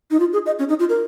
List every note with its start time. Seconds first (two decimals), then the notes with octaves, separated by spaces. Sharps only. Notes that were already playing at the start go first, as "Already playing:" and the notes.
0.11 D#4
0.20 F4
0.33 G#4
0.46 D#5
0.59 C#4
0.69 D#4
0.79 F4
0.89 A#4